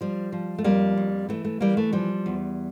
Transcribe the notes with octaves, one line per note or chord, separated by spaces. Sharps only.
F3 G3
F3
A3
F2 G3 A#3
F2
E3 A3
A3
E3 G3 A#3
A3
F3 G3
E2